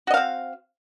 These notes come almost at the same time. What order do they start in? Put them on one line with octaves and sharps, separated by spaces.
F#4 D#5 F5 C4